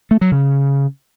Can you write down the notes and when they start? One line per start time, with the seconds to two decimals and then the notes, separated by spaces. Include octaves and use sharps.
0.11 A3
0.21 F#3
0.32 C#3